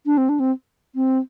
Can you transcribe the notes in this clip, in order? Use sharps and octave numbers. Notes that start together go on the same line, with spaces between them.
D4
C4
D4
C4
C4